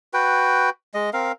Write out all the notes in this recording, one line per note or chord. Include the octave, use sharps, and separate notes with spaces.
F#4 B4 G5
G#3 D#5
C4 A#4 F5